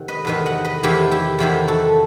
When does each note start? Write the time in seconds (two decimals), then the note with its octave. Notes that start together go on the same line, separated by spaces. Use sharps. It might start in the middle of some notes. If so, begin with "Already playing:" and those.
Already playing: C3 D#3 F#5
0.08 B4 D#5
0.25 E2 C3 D#3 B4 D#5
0.46 D#5 F#5
0.65 B4 D#5
0.83 E2 C3 D#3 E4 G4
1.11 E4 G4
1.39 E2 C3 D#3 E4 G4
1.68 F#4 A4